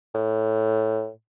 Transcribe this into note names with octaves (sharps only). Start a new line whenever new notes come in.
A2